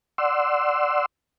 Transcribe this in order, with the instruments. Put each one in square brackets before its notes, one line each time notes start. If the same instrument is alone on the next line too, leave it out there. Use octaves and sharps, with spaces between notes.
[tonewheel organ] D5 F#5 C6 E6